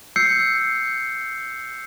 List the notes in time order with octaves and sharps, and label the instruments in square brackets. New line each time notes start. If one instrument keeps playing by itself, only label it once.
[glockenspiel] E6 G6 C7 C#7